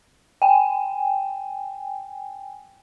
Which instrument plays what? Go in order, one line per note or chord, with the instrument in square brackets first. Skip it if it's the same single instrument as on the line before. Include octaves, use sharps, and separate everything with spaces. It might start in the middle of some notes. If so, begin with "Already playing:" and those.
[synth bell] G5 G#5